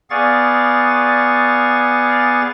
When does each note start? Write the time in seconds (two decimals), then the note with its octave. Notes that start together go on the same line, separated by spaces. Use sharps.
0.10 B3 G#4 D5 F5 C#6 A6